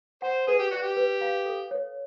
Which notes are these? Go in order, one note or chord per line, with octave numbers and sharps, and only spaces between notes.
C5 F#5
G#4 B4
G4
F#4 D5
G4
B4
F5
A4
C#5